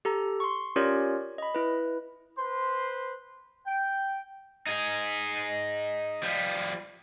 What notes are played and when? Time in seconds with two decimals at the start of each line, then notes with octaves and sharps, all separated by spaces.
0.05 G4 A4 A#5
0.40 C6 C#6
0.76 C#4 F4 G4 A#4 C#5 D5
1.38 D#5 B5
1.55 E4 B4
2.38 B4 C5 C6
3.66 G5
4.67 D#4 G#4
6.23 F3 G3